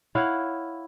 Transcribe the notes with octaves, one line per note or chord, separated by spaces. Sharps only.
E4 C#5 F5 F#5